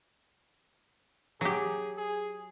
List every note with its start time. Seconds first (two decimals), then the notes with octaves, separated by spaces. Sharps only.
1.41 F#3 G4 G#4
1.97 G#4